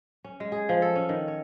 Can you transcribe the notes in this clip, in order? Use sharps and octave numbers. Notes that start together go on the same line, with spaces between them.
C#4
G#3
G#4
F3
A4
C#4
D#3
C#5